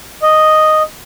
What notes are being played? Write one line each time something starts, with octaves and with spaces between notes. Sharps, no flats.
D#5